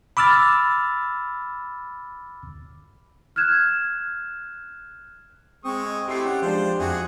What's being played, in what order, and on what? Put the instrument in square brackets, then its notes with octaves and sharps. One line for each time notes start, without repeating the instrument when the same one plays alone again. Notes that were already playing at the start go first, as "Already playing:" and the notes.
[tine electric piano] B5 D6 E6 F6 A6
[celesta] F6 F#6 G#6 E7
[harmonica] G#3 C#6 D#6 [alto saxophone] C4
[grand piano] D#5
[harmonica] A3 E4 [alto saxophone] G4 [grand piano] C6 C7
[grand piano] C#4 [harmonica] F#5
[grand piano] F3 G#3 D4 [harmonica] C5
[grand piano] F2 E5 [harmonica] F#4 G#4